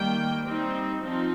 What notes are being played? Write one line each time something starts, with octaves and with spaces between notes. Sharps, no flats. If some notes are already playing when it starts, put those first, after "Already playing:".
Already playing: D#3 G3 A#3 G5
G3 C4 D#4
F3 C4 D#4